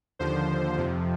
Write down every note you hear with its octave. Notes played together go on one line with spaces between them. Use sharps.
D#2 D3 F3 C5
F2 C3 F3